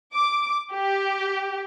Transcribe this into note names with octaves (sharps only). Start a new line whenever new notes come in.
D6
G4